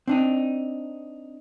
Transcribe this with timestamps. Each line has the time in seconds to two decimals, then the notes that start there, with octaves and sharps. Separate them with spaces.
0.08 C4 D4 D#4